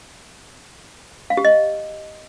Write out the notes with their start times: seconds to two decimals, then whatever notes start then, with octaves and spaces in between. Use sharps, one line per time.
1.30 F5
1.37 G4
1.45 D#5